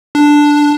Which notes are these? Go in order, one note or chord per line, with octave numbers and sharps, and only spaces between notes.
D4